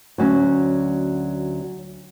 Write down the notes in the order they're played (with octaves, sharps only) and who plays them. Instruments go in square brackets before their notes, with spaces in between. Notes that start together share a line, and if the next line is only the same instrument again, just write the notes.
[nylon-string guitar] D2 F#3 C#4